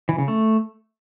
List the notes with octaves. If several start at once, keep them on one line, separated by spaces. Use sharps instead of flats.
E3
C#3
A3